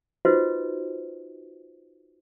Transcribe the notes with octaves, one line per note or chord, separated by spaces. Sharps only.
D#4 F4 F#4 B4 C5 D#5